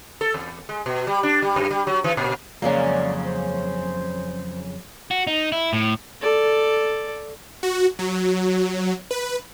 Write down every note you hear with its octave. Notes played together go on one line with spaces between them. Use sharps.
A4
E2
G#3
B2
G3
D4
G3
F#2
G3
F#3
E3
A#2
F2 C#3 F#3 G#3 A#3 D5 G#5
C5
F#4
D#4
E4
A2
A4 D5
F#4
F#3
B4